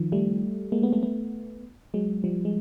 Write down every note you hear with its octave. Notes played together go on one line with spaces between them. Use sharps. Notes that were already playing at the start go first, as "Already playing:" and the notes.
Already playing: D#3 F3
G3 A3
G#3 A#3
A3 B3
A3 B3
A3 B3
F#3 G#3
F3 G3
G#3